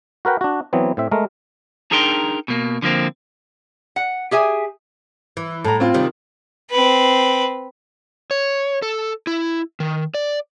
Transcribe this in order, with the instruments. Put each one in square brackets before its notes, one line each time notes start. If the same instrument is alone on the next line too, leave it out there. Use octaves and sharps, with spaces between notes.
[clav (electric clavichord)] F#4 A#4 B4 F#5 G5
D4 F#4
E3 F#3 B3 C4
A2 C4 E5
G#3 A3 A#4
[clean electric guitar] D4 D#4 G#4 A#4 G5 C6
B2 A#3
D3 F3 A#3 C4
[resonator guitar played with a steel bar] F#5
G4 G#4 E5 G#5
[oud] E3
[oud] A2 [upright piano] A4 A#5
[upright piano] C4 F4
[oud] C3 D#3 G3
[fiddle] C4 B4
[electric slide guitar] C#5
A4
E4
D#3
D5